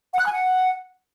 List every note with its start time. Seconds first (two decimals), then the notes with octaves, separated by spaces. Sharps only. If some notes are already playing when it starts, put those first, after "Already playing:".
0.13 F#5
0.19 F#6
0.25 G#5
0.32 F#5